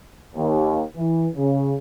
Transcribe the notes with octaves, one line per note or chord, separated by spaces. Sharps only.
D#2
E3
C#3